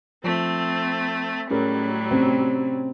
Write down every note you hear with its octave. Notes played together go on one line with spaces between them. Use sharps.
F3 A3 C4
A2 F#3 G3 C#4 G#4 A#4
C3 C4 C#4